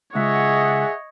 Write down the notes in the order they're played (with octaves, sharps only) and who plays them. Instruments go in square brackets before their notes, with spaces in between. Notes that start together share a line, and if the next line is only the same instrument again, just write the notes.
[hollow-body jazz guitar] C#2 [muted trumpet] G#4 [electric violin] C#5 D#5 [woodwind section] E5 F#5